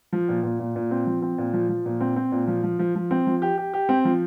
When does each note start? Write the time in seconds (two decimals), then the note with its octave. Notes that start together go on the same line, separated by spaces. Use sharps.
0.13 F3
0.29 A#2
0.44 A#2
0.60 A#2
0.76 A#2
0.91 C4
1.07 F3
1.22 C4
1.38 A#2
1.53 F3
1.69 F3
1.86 A#2
2.01 C4
2.16 C4
2.32 A#2
2.48 F3
2.63 F3
2.79 F3
2.95 F3
3.11 C4
3.26 F3
3.42 G4
3.58 G4
3.74 G4
3.89 C4
4.05 F3